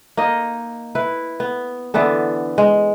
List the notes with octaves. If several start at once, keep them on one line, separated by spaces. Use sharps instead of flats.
A#3 D#4 D#5
E4 B4
B3
D3 E3 B3 A4
G#3